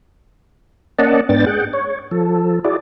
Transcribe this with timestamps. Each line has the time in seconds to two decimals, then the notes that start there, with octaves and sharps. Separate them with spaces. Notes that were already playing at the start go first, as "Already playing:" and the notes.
0.99 A#3 C#4 D5 D#5 F#5 A5
1.29 G#2 B3 D4 G5 A6
1.46 G#4 F#5 G5
1.73 C#5
2.11 F3 A4
2.65 E4 F#4 G#4 D5